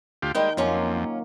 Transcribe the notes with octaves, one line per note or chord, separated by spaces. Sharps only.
D2 F4 G4
D#3 G3 G#3 A#3 G5
F2 F#3 A#3 C#4 F4 A#4